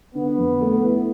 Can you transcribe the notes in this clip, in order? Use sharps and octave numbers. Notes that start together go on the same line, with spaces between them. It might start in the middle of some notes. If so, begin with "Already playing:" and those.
D3 B3
F2
A3
E4